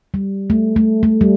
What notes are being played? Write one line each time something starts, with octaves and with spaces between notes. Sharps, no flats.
G3
A3
A3
A3
G3